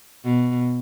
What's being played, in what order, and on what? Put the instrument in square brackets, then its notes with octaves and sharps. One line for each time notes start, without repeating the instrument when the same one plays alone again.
[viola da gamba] B2